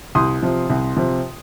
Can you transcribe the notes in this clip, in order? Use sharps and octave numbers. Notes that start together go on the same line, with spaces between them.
C2 C6 D#6
C3 F3
C2
C3 F3